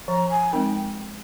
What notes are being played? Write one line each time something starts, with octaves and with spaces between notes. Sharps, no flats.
F3 A#5
G#5
G#3 C4 D#4 A#4 G5